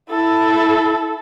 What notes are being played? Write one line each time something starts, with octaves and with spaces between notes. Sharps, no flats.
E4 A4